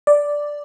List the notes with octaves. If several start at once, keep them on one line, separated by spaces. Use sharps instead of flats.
D5